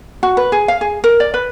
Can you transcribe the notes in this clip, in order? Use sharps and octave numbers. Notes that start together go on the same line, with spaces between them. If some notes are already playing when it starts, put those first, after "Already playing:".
F#4
B4
G#4
F5
G#4
A#4
D5
B4